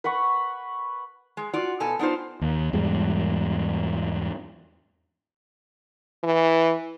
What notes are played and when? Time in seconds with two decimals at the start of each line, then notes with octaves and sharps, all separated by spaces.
0.04 B4 F#5 B5 C#6
1.37 G#3
1.54 F4 F#4 D5
1.80 B2 A4 G#5
1.99 B3 D4 D#4 F4 C5
2.41 D#2
2.73 E2 G#2 G3
6.24 E3